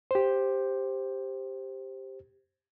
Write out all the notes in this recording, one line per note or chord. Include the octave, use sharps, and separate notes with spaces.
G4 C5